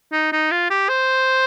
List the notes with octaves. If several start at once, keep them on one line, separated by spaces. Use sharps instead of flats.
D#4
D#4
F4
G4
C5